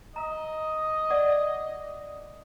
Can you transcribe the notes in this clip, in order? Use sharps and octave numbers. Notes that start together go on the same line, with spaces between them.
D#5 A#5
D5 F#5 D6